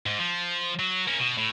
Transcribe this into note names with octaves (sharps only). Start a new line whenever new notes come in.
G#2
F3
F#3
A#3 C#4
B2
A2